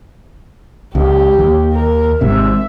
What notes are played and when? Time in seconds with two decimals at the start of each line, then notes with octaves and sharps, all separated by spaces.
0.95 C#2 G4
1.39 D#2
1.73 A#4
2.21 G#1 G#2 C3 E5